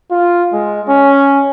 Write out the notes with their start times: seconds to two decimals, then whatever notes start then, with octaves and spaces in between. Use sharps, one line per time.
0.11 F4
0.53 G#3
0.89 C#4